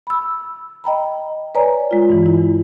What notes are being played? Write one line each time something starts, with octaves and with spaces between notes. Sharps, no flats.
B5 E6
D#5 G5 A#5 B5
B4 C#5 D5 G#5 A#5
G#3 F4
G2 E3
E3 E4